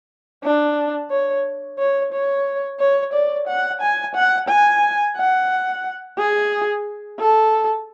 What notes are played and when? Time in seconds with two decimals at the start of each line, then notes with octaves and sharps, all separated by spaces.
0.43 D4
1.11 C#5
1.79 C#5
2.12 C#5
2.79 C#5
3.13 D5
3.48 F#5
3.81 G#5
4.15 F#5
4.49 G#5
5.17 F#5
6.18 G#4
7.19 A4